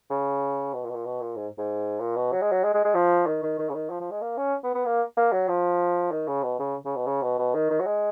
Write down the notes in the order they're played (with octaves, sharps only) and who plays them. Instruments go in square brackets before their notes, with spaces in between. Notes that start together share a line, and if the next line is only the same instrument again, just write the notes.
[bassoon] C#3
B2
A#2
B2
A#2
B2
A#2
G#2
G#2
A#2
B2
F#3
G#3
F#3
G#3
G#3
G#3
F3
D#3
D#3
D#3
C#3
D#3
F3
F3
G#3
A#3
C#4
B3
B3
A#3
A#3
F#3
F3
D#3
C#3
B2
C#3
C#3
B2
C#3
B2
B2
D#3
D#3
F#3
G#3